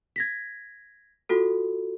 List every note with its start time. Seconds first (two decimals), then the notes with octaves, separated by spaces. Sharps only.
0.16 G#6 A#6 B6
1.29 F4 F#4 A4